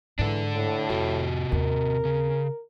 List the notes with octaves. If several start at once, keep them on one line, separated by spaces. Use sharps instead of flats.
G#2 E3 D4 A4
A2
F2 C3 F#4
D#2 C4 A#4
C#3